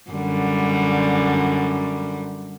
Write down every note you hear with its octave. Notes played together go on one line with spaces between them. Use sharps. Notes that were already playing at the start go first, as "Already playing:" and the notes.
F#2 D3 G3